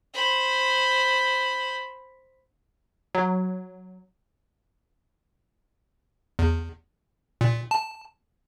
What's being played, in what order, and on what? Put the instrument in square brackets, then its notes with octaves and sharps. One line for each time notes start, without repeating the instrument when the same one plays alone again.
[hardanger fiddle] C5 B5
[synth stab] F#3
[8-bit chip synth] E2
A#2
A5